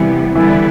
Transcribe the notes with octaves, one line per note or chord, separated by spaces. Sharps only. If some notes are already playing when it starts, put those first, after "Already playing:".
Already playing: C3 E3 G3 B3
D3 E3 G3 B3 E4